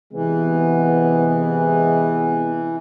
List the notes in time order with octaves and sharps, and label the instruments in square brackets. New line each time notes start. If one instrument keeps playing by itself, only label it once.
[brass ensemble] C3 G#3 B3 [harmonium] E3